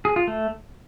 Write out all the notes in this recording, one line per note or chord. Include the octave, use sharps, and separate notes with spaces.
G#4
F4
A3